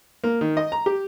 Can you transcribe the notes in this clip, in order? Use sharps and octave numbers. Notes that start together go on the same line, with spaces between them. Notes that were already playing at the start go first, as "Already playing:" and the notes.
A#3
D#3
D#5
A#5
G4